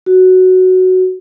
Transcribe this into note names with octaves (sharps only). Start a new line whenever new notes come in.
F#4